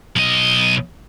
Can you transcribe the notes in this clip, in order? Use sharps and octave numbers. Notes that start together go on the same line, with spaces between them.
B1 D#5